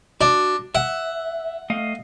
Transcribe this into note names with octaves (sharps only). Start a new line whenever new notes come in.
D4 F#4
E5 F#5
A3 D#5 F5